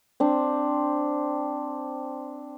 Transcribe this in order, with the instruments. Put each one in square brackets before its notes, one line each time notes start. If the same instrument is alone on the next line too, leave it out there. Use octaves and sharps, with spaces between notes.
[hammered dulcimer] C4 D4